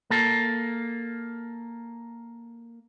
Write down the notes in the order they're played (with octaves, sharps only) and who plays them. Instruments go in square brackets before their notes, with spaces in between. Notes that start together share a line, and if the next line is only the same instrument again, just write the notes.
[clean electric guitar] A#3 A4